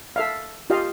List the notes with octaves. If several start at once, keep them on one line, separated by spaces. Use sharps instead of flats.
A4 E5 F5
F4 G4 D#5 F5